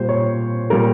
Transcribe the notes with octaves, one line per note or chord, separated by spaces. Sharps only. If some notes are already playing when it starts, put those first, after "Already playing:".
Already playing: A#2 G3 C5
C#5
A#2 G3 A#4